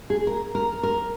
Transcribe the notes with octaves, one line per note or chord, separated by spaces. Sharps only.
G#4
A#4
A#4
A#4